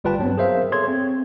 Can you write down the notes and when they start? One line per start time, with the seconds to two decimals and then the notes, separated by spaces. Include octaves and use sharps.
0.04 G1 G3 F4 B4 G5 A5
0.19 G2 F#3 B3 C4
0.37 G#4 A#4 C5 E5 F5
0.72 G#4 A4 C#5 C6 G#6
0.88 C4